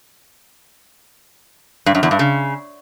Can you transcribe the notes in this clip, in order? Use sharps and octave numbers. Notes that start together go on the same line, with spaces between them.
G2
F#2
E2
G2
C#3